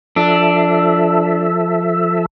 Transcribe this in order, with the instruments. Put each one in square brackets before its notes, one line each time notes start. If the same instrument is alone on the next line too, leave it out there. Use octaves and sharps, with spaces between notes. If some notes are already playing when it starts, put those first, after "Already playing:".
[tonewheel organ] F3 A4 E5 [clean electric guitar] D4